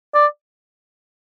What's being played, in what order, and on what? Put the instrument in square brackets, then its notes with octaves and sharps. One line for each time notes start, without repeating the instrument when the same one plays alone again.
[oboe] D5